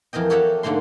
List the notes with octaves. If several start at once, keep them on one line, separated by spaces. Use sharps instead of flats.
F2 E3 A#4 D#5 G5
F#4 G4 A4 C#5 E5 F#5
G#2 D3 A3 A#3 C6